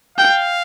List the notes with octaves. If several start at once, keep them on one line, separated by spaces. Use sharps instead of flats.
F5 G5